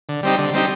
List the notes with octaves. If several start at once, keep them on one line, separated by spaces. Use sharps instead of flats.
D3
G3 C4 D#4 G4
D3
G3 C4 D#4 G4